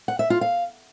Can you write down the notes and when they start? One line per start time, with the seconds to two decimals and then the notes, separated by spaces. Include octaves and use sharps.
0.08 F#5
0.19 E5
0.30 F4
0.41 F5